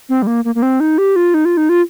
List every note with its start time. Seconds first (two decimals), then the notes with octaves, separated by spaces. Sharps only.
0.09 C4
0.22 G3
0.27 A#3
0.45 A#3
0.55 A#3
0.62 C4
0.80 D#4
0.98 G4
1.16 F4
1.34 D#4
1.45 F4
1.57 D#4
1.69 F4